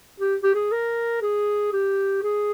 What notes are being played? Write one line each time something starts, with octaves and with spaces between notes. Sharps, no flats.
G4
G4
G#4
A#4
G#4
G4
G#4